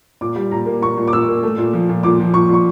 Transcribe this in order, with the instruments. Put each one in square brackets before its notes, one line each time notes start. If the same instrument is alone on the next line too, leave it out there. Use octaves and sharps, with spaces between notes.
[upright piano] A#2 D6
G3
A#2 A#5
A#3
A#2 C#6
A#2
D6
A#2 E6
A#3
A3
A#2
F3
A#2
A#2 D6
F3
A#2 C#6
A#2 C#6